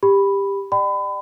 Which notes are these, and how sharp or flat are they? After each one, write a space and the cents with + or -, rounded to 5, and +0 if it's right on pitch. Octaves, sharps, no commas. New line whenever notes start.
G4 +15 B5 +0
D5 +35 G5 -20 B5 +30